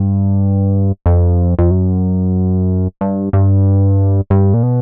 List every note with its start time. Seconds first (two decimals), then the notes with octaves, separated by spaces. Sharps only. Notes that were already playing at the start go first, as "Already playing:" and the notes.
Already playing: G2
1.06 F2
1.59 F2
1.71 F#2
3.01 G2
3.33 G2
4.30 G2
4.54 A#2
4.63 B2